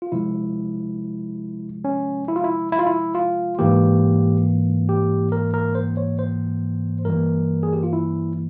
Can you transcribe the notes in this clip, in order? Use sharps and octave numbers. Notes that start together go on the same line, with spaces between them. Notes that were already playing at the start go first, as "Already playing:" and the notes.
F4
C3 F3 G#3 E4
C#4
E4
F4
E4
E4
F4
E4
F4
G#2 E3 A#3 G4
G4
A#4
A#4
C5
C#5
C5
G2 E3 G3 A#3 A#4
G#4
G4
F4
E4